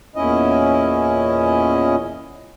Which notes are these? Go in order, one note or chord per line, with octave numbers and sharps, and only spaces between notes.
E2 A#2 C#4 E4 D#5